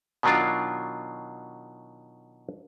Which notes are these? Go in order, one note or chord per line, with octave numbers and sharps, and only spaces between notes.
B2 D#3 F#3 D4 F4